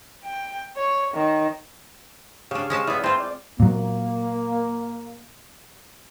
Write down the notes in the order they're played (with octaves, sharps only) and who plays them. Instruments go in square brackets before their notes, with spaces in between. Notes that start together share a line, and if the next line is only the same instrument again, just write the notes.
[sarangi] G5
C#5
D#3
[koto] C#3 D4 [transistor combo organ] G4 C#5 F5
[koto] G#3 C#4 A5
[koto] B3 G#4 [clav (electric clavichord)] E4 D5
[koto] C4 F4 [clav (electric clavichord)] E4 G5 [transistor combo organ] C5 A5 C6
[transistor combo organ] D5
[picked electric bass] A#2 F#3 [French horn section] A#3